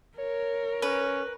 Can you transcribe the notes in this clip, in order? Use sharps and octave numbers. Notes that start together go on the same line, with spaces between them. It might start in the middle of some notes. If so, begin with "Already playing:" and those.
A#4 C#5
C#4 B4